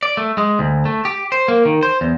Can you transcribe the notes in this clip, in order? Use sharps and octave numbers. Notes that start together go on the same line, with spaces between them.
D5
A3
G#3
D2
A3
G4
C5
A#3
D#3
C5
E2